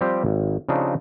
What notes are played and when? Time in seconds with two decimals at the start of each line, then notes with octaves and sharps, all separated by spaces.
0.01 F3 G3 C4 G4 C5
0.25 G#1
0.69 C#3 F3 C4 D4 D#4 G4